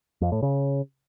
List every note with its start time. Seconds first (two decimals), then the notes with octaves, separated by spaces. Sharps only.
0.21 F2
0.32 A2
0.42 C#3